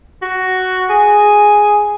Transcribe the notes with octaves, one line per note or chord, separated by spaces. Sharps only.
F#4
G#4